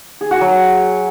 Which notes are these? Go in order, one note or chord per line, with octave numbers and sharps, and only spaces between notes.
G#4
F#4
F#3